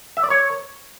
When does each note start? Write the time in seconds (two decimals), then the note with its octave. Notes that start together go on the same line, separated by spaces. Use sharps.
0.17 E5
0.24 D5
0.30 C#5